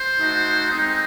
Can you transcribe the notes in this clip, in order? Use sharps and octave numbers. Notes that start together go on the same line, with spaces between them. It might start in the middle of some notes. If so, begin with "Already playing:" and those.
Already playing: C5
A3 D#4 F#4
G#3 C4 D#4